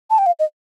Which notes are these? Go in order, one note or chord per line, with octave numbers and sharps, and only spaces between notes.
A5
G5
F5
D#5